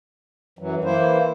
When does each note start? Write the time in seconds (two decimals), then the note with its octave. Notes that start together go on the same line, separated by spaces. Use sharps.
0.59 F#2 E3 F#3
0.84 E3 A#3 E4 C5